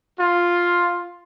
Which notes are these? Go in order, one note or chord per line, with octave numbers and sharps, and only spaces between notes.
F4